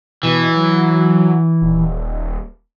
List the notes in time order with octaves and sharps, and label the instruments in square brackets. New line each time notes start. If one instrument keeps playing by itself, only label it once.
[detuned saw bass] B2 [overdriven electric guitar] E3
[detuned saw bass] F#3
D#1